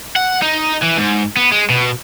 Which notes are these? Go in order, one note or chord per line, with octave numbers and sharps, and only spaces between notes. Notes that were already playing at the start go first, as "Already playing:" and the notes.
F#5
D#4
E3
G#2
B3
G#3
B2